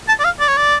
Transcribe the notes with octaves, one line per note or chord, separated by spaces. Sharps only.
A5
D5
F5
D5
C#5
D5